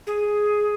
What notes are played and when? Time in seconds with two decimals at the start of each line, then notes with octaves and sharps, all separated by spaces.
0.07 G#4